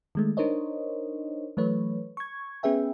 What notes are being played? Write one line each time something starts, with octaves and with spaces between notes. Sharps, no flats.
D#3 G#3 A3
D4 D#4 A#4 C5 C#5 D#5
E3 F#3 A3 B4 C#5
C#6 G#6
B3 C#4 G#4 B4 E5 G5